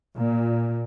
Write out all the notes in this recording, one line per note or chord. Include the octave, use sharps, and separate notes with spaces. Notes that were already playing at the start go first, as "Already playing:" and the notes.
A#2